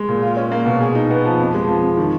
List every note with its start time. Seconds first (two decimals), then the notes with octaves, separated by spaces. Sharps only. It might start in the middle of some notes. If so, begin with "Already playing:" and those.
Already playing: G#3
0.09 A#2
0.23 F4
0.37 C#4
0.52 A#3
0.66 B2
0.81 G#4
0.95 D#4
1.11 B3
1.25 F3
1.40 F2
1.54 G#3
1.68 F3
1.83 F2
1.97 D#3